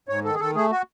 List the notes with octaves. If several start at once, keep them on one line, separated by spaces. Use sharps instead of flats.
G#2 C#5
D#3 A4
G#4
D#3 A4
A3 G#4
F#4